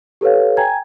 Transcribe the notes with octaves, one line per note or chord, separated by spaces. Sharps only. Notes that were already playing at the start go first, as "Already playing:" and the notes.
G4 A4 B4 C#5 F5
G5 G#5 A#5 G#6